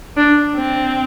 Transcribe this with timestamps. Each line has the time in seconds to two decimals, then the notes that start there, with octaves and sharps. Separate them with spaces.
0.17 D4
0.56 C4